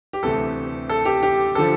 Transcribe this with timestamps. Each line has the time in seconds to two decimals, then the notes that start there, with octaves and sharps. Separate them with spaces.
0.13 G4
0.23 D2 C3 E3 A3 A4
0.89 A4
1.05 G4
1.23 G4
1.55 D3 F3 A4